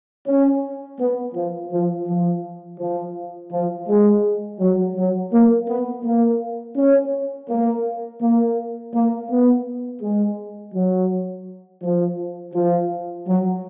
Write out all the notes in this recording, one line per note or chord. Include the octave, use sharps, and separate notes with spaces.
C#4
B3
F3
F3
F3
F3
F3
G#3
F#3
F#3
A#3
B3
A#3
C#4
A#3
A#3
A#3
B3
G#3
F#3
F3
F3
F#3